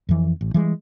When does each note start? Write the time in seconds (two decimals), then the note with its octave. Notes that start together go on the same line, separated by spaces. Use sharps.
0.09 F2 E3
0.41 A1
0.54 E3 G3 G#3